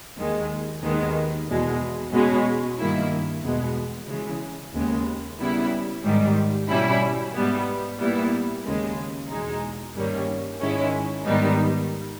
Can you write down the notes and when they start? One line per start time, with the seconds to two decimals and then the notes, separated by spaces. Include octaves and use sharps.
0.17 D#2 D#3 G#3
0.82 D#2 D#3 G#3 B3
1.48 E2 B2 G#3
2.12 B2 G#3 C#4
2.78 G2 D#3 A#3 E4
3.43 E2 B2 G#3 B3
4.08 C#3 E3 G#3
4.74 D#2 C#3 G#3 B3
5.39 C#3 G3 B3 E4
6.04 G#2 D#3 G3
6.69 B2 G3 C#4 E4
7.34 G#2 G3 B3
7.99 A#2 G3 B3 E4
8.65 D#2 C#3 G#3
9.29 E2 B2 G#3 D#4
9.94 G2 D#3 G3 A#3 C#4
10.60 G#2 D#3 G#3 C#4 E4
11.24 G#2 D#3 G3 B3 D#4